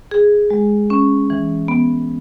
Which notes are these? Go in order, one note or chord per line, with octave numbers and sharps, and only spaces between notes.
G#4
G#3
C#4
E3
B3